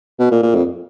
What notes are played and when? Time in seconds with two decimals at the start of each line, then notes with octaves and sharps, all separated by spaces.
0.19 B2
0.31 A#2
0.42 A#2
0.55 F2